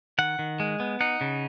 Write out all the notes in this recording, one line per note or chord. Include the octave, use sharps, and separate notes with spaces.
D#3 F#5
D#3
G#3
B3
D#4 F#5
C#3